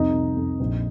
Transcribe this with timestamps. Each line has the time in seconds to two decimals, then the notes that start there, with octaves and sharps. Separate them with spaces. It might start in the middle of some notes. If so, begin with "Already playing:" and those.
Already playing: C2 F2 D#4 D#5
0.14 C3
0.36 F2
0.60 A#1